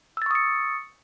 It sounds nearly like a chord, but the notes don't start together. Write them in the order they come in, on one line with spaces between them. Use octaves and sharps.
E6 A6 C#6 D#6 C#7